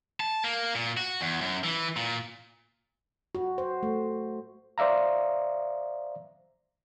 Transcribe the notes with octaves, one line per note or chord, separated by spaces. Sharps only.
A5
A#3
A#2
F#4
E2
F#2
E3
A#2
F#4
C5
A3
C5 D5 E5 F5 A#5